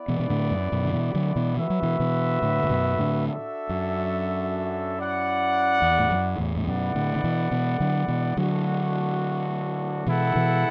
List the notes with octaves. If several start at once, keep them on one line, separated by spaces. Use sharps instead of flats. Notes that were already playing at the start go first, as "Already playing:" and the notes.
Already playing: B3 E4 B4 D5
B2 E3
B2
A2 D3
F#2
F#2 B2
D3
B2 E3
D3 F#3
B2 E3
E3 F#4 B4 E5
F#3
B2 E3
B2 E3
A2 D3
A2
F#2 B2
A2 D3
D4 F#4 A4 E5
F#2
E4 D5 F#5
E2
A2
F#2
E2 A2
A2
F#2 B2 B3 E4 D5 F#5
A2 D3
D3
B2 E3
B2 E3
D3 F#3
B2 E3
D3 F#3 A3 D4 F#4
B2 E3 B3 E4 A4 F#5
B2 E3